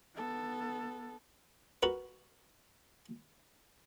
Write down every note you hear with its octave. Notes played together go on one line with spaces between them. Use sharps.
B3 A4
F#4 A#4 B4